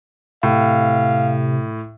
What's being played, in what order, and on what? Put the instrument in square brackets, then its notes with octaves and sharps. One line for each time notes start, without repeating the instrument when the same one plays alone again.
[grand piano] A2 [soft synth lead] C3 [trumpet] F5